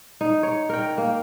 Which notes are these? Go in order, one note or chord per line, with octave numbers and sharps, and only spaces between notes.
D#4
C#5
A#4 G5
A#3